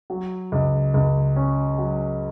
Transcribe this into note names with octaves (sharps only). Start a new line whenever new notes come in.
F#3
C#2
C#2
C#4
F#3